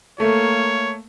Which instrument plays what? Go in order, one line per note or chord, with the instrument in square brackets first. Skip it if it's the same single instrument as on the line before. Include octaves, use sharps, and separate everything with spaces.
[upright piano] A3 [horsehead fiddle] A#3 [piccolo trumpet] C#5